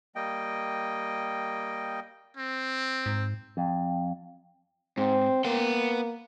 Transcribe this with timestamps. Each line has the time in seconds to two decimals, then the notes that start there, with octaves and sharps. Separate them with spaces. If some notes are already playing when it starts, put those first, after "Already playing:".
0.15 G3 A#3 D#5 G5
2.37 C4
3.06 G#2
3.57 F2
4.98 G#2 C4
5.45 A#3 B3 G5